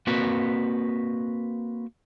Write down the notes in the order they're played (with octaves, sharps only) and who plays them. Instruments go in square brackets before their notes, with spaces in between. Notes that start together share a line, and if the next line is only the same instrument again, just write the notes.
[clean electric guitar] A#3 C4 F#4 A#4 B4